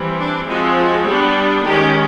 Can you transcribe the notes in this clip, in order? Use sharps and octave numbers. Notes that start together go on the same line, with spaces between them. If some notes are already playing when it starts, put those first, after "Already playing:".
Already playing: E3 G3 C4
D4
F3 G#3 C4 F#4
G3 B3 D4
D#3 G#3 C#4 G4